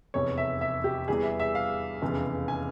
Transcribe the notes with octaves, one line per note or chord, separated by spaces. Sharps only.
F1 E2 C3 C#5
E5
E5
G4
E2 E3 G3 G#4
E5
E5
F5
F1 E2 C#3 E3
G#5